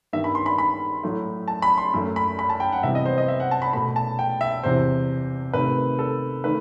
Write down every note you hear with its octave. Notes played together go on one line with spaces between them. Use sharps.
G2 D#3 G3 B3 E5
B5
C6
B5
B5
A2 F#3 A3
A5
B5
C6
F#2 F#3 A3
B5
B5
A5
G5
F#5
C3 E3 G3 B3 E5
D#5
C5
D#5
E5
F#5
A5
B5
B2 A3 B5
A5
G5
E5
E2 C3 E3 C5
C3 D#3 A3 B4
A4
D#3 A3 B4